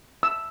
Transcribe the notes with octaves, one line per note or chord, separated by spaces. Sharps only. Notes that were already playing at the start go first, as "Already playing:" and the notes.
E6